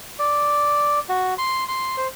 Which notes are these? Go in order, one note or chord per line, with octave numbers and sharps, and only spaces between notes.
D5
F#4
C6
C6
C5